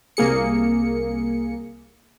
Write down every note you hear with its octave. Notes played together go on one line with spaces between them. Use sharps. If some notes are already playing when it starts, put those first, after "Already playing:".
C2 A#3 G#4 C#7